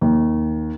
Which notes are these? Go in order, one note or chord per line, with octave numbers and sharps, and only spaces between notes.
D#2